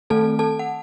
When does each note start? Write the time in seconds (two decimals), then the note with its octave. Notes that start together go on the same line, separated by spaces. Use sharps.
0.10 D#3 A3 C4 A4 A5
0.39 A4 A5
0.59 F#5